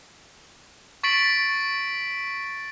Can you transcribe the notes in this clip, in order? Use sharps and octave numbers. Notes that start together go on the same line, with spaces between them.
C#6 A6 B6 C7 D7 F#7